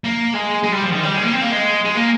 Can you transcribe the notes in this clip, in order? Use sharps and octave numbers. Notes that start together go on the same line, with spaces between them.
A#3
G#3
G#3
G3
F3
D#3
G3
G#3
A#3
C4
A#3
G#3
G#3
A#3